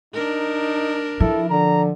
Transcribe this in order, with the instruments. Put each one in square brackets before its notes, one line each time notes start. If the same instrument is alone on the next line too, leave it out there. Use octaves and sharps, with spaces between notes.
[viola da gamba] D4 A#4 [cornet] D#4
[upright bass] F3 [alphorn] E4 [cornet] A4
[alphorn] D3 [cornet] A#5